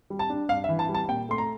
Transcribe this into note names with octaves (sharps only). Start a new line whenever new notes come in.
G3
A5
D4
G2 F5
E5
E3
A5
G3
A5
A#2 G5
A3 C6
A#5